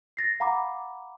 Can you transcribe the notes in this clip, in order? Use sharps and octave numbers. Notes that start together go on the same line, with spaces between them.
A6 A#6 C7
F5 F#5 A#5 B5 D6